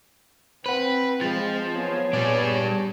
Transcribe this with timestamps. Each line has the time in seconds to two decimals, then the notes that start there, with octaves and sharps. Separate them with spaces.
0.66 C4 B4 C5 F#5
1.21 F3 G#3 A6
1.75 B3 G#4 C#5
2.13 A#2 G3 D4 D6